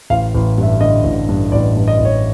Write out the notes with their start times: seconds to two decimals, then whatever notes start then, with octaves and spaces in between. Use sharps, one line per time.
0.10 A1 F5
0.35 A1
0.58 G2
0.63 E5
0.81 D3 D#5
1.04 A1
1.29 G2
1.52 A1 D5
1.76 G2
1.88 D#5
1.99 A1
2.05 C#5